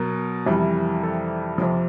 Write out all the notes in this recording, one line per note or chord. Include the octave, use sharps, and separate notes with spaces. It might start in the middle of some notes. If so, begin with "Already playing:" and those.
Already playing: B2 F#3 A#4
F2 C3 E3 G3
A4
F2 C3 F3